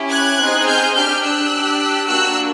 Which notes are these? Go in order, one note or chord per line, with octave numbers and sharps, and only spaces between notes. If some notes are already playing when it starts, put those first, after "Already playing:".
Already playing: C#4 E4 G4
F#6 G#6
C4 D#4 G#4
F6 G6
D4 G4 F6 G6
E6 F#6
D4 G4
A#3 D4 F#4 E6 F#6